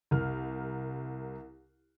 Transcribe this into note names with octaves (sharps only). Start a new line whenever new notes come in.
C2 A#4 F6